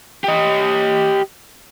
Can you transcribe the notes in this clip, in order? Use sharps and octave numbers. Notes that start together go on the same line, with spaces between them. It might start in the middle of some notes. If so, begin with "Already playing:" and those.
G4 D#5